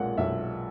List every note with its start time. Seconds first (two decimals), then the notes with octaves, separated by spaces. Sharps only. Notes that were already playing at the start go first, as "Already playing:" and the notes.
Already playing: B1 A#2 G#3 F#5
0.18 B1 E5